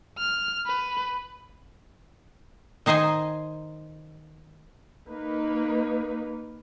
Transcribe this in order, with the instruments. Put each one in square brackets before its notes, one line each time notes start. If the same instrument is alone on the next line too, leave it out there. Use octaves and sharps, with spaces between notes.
[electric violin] F6
B4
[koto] D#3 D#4 C5 D#5 G#5
[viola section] A#3 D#4 B4